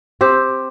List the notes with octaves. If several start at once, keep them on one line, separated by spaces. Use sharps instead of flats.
C4 G4